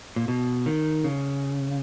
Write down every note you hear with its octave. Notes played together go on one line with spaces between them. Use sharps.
A#2
B2
D#3
C#3